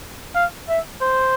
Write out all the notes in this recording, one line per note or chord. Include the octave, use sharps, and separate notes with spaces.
F5
E5
C5